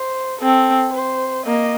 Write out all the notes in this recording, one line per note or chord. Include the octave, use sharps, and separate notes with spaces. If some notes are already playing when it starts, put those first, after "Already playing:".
Already playing: C5
C4 A4
C5
A#3 D#5